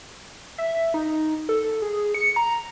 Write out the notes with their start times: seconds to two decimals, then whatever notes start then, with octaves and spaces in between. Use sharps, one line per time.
0.58 E5
0.94 D#4
1.49 A4
1.82 G#4
2.14 C#7
2.36 A#5